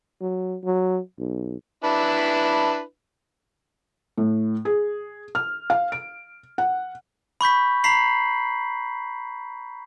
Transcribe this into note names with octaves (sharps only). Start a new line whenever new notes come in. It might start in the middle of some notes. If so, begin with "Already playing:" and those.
F#3
F#3
B1
D4 E4 B4
A2
G#4
F6
F5
D7
F#5
B5 C#6 G6 B6
A#5 B5 B6 C7 F#7